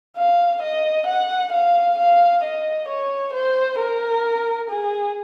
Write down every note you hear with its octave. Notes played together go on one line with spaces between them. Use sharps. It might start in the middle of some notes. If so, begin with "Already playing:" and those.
F5
D#5
F#5
F5
F5
D#5
C#5
C5
A#4
G#4